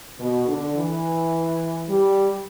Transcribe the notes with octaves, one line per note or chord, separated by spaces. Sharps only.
B2
D3
E3
G3